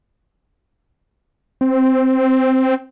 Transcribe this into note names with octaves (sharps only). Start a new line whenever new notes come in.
C4